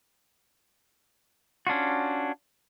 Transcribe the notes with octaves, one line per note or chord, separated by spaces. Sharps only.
C#4 D4 F4 F#4